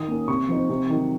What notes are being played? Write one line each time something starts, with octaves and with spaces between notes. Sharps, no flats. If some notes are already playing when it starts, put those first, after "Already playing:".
Already playing: D#3 D#6
A#3 C#4
C3 C#6
F3 C4 D#4
C3
D#3 F#3